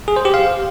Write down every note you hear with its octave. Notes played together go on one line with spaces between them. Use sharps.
G#4
C5
G4
F5